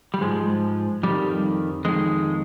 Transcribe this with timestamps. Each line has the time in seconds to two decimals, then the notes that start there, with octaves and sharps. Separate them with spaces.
0.14 G3
0.21 G#2 F3 G#3
1.03 F2 D#3 G3
1.85 F2 D#3 G#3